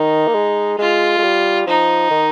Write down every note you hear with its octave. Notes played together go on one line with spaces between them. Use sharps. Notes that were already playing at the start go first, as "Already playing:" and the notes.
Already playing: D#3 D#4
A#3
G#3
G#3 F4
G#3
G3
F3 D#4
D#3